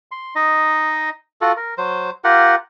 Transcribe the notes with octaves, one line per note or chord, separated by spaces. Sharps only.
C6
D#4 D#5
F4 F#4 A4
A#4
F#3 C5
F4 G4 A#4 F#5